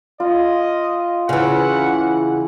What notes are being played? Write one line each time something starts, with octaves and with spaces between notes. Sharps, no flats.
F4 D#5
C#3 E3 C#5 F#5 G#5